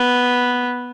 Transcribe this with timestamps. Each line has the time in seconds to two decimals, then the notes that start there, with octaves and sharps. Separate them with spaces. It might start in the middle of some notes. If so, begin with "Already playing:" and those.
Already playing: B3